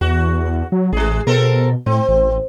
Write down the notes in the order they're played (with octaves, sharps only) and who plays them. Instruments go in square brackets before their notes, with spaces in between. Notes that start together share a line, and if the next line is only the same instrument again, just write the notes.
[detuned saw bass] E2 [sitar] F#4
[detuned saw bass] F#3
[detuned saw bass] A1 [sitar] G#3 G#4
[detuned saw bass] B2 [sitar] C4 A4 A#4
[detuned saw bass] A2 [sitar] C4
[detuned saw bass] A1